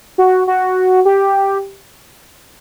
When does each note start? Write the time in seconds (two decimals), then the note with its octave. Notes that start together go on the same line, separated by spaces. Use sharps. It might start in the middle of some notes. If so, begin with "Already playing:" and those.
0.18 F#4
0.47 F#4
1.05 G4